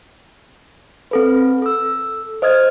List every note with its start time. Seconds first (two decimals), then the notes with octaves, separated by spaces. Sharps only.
1.11 C4 A4 B4
1.62 A4 E6
2.42 C5 D#5 D#6 F6 G#6